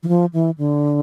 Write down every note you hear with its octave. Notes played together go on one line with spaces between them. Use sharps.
E3
F3
E3
D3